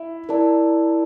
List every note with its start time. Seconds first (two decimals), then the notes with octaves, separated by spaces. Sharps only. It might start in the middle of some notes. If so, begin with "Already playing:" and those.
Already playing: E4
0.29 E4 A#4 D5 A5